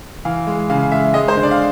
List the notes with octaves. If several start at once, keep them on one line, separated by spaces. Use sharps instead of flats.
E3 F5
G#3
C#3 F5
G#3 E5
G#3 D#5
C5
D3
D5
F5